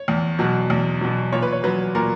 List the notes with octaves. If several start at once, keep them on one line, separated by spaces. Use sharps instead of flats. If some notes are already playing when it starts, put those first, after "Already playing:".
Already playing: C#5
E2
B2 F#3
E2
B2 F#3
A#2 C#5
B4
C#5
F#3 B4
A#2 A#4